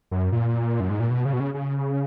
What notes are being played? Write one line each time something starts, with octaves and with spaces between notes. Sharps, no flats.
F#2
A#2
F#2
G#2
A#2
B2
C#3
B2
C#3
C#3